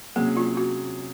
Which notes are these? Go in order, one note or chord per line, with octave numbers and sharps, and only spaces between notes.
C3 F#3 A#3 C#4 G#4
F4
F#4